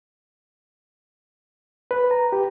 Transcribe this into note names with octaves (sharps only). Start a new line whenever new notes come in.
B4
A#5
G4